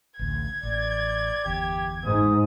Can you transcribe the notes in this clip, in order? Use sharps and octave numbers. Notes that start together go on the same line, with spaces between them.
A1 D2 G#6
A1 D5
G1 E2 G4
G#2 D#6